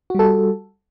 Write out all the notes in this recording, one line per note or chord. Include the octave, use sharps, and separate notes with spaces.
G3 F#4 A4